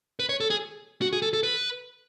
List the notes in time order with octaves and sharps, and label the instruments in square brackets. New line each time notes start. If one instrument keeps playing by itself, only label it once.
[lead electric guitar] B4
C#5
A4
G#4
F#4
G#4
A4
A4
B4